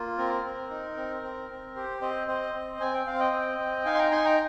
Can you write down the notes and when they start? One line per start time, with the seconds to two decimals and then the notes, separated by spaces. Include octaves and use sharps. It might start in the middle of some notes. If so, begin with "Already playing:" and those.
Already playing: A#3 F4
0.18 C4 A#4
0.44 C4
0.70 D#4
0.97 C4
1.22 C4
1.50 C4
1.76 G4 C5
2.01 C4 C5 D#5
2.28 C4 C5 D#5
2.54 C4
2.80 C4 G#5
2.94 G5
3.07 C4 F5
3.20 D#5 G5
3.33 C4
3.59 C4
3.85 D#4 F5 G#5
3.95 C6
3.99 G5 A#5
4.11 D#4 G#5 C6
4.25 G5 A#5